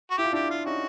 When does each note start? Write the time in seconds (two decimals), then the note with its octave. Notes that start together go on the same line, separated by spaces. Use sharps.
0.11 F#4
0.18 E4 G4
0.24 F4
0.32 D4 E4 G4
0.51 F4
0.66 C#4 D#4 F#4